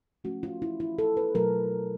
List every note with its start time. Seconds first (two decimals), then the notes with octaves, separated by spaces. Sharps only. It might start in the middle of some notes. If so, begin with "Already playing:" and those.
0.24 F3 A3 C#4 F#4
0.43 F4
0.62 E4
0.80 E4
0.98 A4
1.17 B4
1.35 B2 F#3 A3 A#4